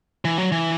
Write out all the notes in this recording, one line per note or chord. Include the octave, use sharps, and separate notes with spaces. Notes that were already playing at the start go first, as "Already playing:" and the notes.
E3
F#3
E3